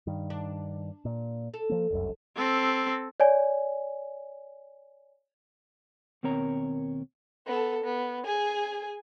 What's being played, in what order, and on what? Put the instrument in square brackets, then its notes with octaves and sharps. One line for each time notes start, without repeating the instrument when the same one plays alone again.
[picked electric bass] G2 D#3
[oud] D4
[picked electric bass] A#2
[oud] A4
[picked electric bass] F3 A#3
F1 C2 F#2
[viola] C4 A4
[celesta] C#5 D5 G#5
[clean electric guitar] D#2 B2 C4 A#4 C#5 A#5
[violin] B3 A4
B3
G#4 G#5